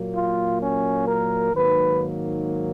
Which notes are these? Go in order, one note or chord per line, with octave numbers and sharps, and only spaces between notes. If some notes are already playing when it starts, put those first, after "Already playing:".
Already playing: A#2 F#3 A#3
F4
C#4
A#4
G#2 D#3 F#3 A#3 B4